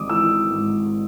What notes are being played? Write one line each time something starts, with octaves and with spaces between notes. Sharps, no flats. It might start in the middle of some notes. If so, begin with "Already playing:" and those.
Already playing: G#1 G#2 D6 D#6
E3 E6
G#2